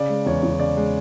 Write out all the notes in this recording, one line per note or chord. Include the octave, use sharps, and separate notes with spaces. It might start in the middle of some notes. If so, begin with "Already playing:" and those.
Already playing: C#3 D5
G#3
E2 C#5
E2
C#3 D5
G#3